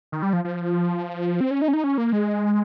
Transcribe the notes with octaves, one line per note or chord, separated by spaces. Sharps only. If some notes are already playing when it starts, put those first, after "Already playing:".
D#3
G3
F3
F3
C4
C#4
D#4
C#4
D#4
C#4
A#3
G#3